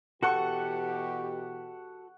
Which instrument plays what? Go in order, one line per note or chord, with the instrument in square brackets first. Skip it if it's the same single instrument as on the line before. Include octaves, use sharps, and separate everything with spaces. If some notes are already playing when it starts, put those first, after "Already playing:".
[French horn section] B2 E3 G4 [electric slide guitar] F#4 A4 [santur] F#5 C#6